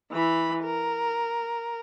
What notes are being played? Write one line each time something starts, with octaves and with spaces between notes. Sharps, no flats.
E3 B5
A#4